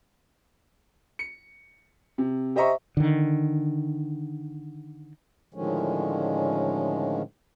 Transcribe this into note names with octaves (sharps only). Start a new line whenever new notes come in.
C#7
C3
G4 C5 D#5 E5 A#5 C#6
D3 D#3
A2 D3 D#3 F3 G#3 C#4